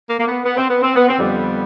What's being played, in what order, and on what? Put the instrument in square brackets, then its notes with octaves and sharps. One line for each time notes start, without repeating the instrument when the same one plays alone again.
[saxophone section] A#3
A#3
B3
B3
C4
B3
C4
B3
C4
F2 D3 G3 B3